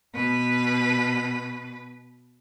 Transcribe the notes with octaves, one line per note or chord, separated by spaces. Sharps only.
B2 B4